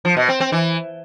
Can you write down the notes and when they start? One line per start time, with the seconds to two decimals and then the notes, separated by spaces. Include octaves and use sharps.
0.05 F3
0.17 B2
0.29 C4
0.40 C4
0.52 E3